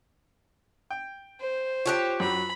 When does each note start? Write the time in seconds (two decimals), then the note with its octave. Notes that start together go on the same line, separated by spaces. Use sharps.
0.91 G5
1.40 C5
1.86 F4 G4 G#4 C#5 F#6
2.20 F#2 F#3 B5